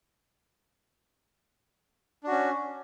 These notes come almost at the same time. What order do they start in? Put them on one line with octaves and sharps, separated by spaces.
D4 F#4 C#4